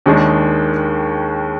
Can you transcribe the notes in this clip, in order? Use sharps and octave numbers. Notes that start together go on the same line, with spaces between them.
D#2 D#3 G#3 D4